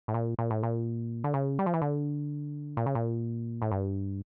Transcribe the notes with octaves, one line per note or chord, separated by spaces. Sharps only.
A2
A#2
A#2
A2
A#2
D3
C#3
G3
F3
E3
D3
A#2
C#3
A#2
A2
G2